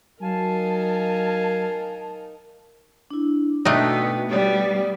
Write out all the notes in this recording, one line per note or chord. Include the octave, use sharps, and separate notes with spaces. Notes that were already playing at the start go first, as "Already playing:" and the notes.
F#3 D#4 A#4 F5 G#5 A5
D4 E4
B2 A3 B3 D4 D#4 G5
G3 B3 G4 D5